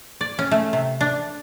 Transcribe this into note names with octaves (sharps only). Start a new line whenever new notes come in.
D5
C#4
A3
C3
D4